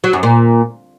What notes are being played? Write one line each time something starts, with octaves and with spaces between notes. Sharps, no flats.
F#3
F#2
A#2